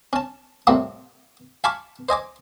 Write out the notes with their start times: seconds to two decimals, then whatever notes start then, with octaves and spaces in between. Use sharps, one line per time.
0.13 C#4 A5
0.67 A2 C3 F3 G3 A#3
1.64 F5 G#5 A5 B5 C#6 D6
2.09 C5 D#5 G#5 D6